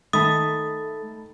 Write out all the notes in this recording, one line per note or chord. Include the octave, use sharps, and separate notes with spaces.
D#3 A3 A5 B5 D#6 A6